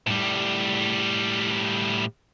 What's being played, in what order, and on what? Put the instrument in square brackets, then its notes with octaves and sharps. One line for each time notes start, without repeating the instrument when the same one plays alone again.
[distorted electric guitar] A2 G3